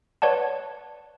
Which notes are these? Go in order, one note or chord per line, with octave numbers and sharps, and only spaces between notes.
B4 C#5 D5 F#5 A5